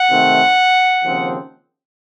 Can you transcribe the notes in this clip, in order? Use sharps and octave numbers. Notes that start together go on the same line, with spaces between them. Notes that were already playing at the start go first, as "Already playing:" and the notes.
Already playing: F#5
C3 D#3 A3 C4
D#2 C#3 F3 C4